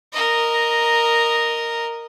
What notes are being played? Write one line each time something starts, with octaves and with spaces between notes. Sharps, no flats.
A#4 D#5